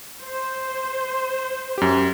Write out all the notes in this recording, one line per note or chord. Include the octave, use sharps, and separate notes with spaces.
C5
F#2 G4